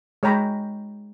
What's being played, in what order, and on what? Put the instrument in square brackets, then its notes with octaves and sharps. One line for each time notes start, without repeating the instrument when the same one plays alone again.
[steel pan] G#3 C#5 G5 A#5 B5